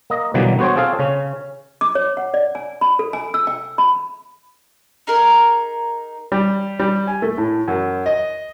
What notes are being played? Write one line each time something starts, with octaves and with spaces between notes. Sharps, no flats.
A#3 D#5
B2 D3 E3 F#3 G3 A#3
B3 F#4 C5 C#5 G5
C4 F4 G#4 A4 F5
C#3 C#4
D6
C#5
F#5
D5
G#5
B5
A4
G#5
E6
G5
B5
D#4 G#4 A#4
G3
G3
G#5
A3
A2
F#2
D#5